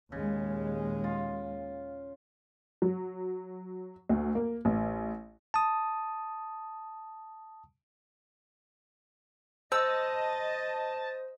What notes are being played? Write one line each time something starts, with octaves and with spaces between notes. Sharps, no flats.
D#2 A#2 C#3 G#3
F4
F#3
D2
A#3
A1
A5 D#6
C5 D#5 A5 E6